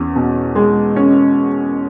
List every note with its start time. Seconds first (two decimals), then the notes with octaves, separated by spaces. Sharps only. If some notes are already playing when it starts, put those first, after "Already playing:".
Already playing: E2 C#4
0.16 B2
0.55 G#3
0.96 C#4